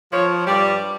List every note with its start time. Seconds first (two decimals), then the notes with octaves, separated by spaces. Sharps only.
0.13 F3 C#5
0.47 G2 G3 D5